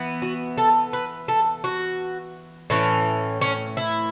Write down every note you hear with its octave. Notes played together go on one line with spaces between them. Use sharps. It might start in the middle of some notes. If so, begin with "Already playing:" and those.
Already playing: E3 B3
F#4
A4
B4
A4
F#4
A2 E3 C#4
C#4
E4